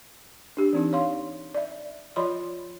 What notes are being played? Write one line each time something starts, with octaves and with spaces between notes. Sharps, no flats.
D4 G4
E3 C4 D#4
C#5 F5 C6
D5 E5
F3 F4 C#5 D#5 B5 C6